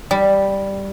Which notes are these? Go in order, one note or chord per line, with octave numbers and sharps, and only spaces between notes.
G3